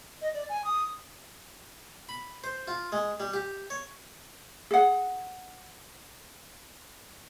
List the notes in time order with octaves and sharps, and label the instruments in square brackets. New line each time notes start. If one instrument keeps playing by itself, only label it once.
[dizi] D#5
D5
G#5
D#6
[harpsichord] B5
C5
F4
G#3
G3
G4
C#5
[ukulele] G#4 F#5